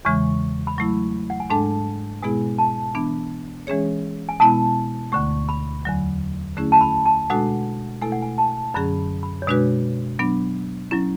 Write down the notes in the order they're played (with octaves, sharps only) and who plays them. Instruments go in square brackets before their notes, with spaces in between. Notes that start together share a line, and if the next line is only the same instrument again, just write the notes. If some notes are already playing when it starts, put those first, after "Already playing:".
[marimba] E2 C#3 E3 G#3 [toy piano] C#6
[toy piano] B5
[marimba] F#3 A3 E4 [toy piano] C#6
[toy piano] F#5
G#5
[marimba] G#2 G#3 D4 A4 [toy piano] A5
[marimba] B2 G#3 B3 E4 G#4 [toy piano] G#5
[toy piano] A5
[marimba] E3 B3 D4
E3 G#3 C#4 G#4 C#5
[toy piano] G#5
[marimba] B2 G#3 B3 E4 [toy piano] A5
[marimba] D2 D3 A3 [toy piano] C#6
[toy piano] B5
[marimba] E2 D3 F#3
D3 A3 C#4 E4 G#4
[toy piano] A5
B5
A5
[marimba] B2 G#3 D4 F#4 A4 [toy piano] F#5
[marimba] B2 A3 E4 A4 [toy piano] G#5
[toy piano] F#5
G#5
A5
[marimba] F#2 D3 F#3 C#4 G#4 [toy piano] B5
[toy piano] B5
C#5
[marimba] B2 G#3 D4 F#4 B4 [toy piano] D5
[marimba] F#3 B3 D4
[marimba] F#3 C#4 [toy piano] E4